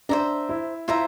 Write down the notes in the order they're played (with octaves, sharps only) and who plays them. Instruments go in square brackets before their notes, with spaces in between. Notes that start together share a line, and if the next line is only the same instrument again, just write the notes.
[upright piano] D4 [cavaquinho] C5 E5 A#5
[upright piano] E4
[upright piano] E4 [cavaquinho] F4 C5 E5 A#5